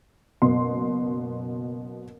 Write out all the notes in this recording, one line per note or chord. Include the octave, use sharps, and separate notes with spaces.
F#1 B2 C6